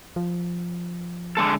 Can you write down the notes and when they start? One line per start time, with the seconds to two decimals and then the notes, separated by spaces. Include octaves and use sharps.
0.16 F3
1.37 D3 G#3 A4